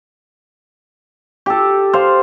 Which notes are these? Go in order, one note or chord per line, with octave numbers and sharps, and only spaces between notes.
G4 A4
C5 F5